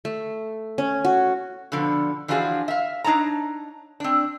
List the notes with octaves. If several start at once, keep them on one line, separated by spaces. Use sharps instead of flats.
A3
C#4
F#4
B2 D3 F3
E3 F3 D4 F4 F#4 G#4
E5 F5
D4 D#4 C#5 A5 A#5
C4 D4